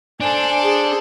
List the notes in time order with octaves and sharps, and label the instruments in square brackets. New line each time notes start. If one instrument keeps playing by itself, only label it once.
[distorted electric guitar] D4 [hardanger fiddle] A4 C5 [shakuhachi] G#5
[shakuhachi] G#4